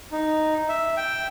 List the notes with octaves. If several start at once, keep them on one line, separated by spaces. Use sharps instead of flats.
D#4
E5
G5